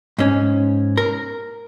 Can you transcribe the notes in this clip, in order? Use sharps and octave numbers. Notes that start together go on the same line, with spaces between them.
G#2 C#4
A#4